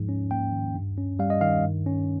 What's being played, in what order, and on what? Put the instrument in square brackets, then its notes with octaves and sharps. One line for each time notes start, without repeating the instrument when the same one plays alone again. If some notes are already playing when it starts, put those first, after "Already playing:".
Already playing: [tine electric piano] G#2 F3
C#4
A#3 G5
D#3
G2
C#4
G3 F5
D#5
D#3 F5
G2
C#4